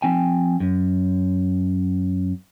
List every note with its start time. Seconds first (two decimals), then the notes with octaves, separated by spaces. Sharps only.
0.02 F3 C4 G5 G#5
0.60 F#2